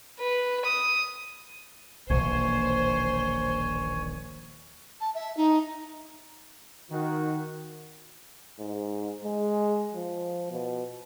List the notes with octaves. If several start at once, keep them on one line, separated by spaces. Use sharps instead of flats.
B4
D#6
D#1 A#1 B2 E3 A#3 C5 C#5 G#5
A5
E5
D#4
D#3 F#4
G#2
G#3
F3
B2